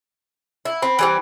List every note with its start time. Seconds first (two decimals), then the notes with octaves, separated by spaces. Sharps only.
0.65 E4
0.82 C4 B5
0.99 E3 G3 C4